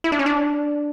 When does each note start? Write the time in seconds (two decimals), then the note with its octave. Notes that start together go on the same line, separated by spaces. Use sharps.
0.04 E4
0.12 D4
0.19 C#4
0.26 D4